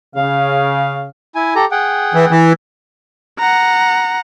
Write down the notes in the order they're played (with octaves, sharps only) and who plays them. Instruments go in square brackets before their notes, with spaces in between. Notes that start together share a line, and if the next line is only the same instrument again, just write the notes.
[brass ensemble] C#3 [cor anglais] F5
[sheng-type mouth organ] E4 G#5
G4 A4 A#5
G#4 F#5 G5
[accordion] E3
E3
[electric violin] F#5 A#5